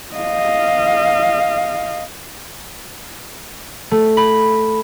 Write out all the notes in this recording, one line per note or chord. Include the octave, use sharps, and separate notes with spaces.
D#5 F5
A3
B5